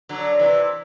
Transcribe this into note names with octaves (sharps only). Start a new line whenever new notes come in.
D3 F#3
C3 E3